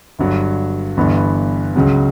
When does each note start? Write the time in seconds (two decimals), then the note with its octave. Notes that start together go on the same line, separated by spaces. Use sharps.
0.19 G1 G2 F#3
0.97 G1 G2 E3 B3
1.76 C#2 C#3 F#3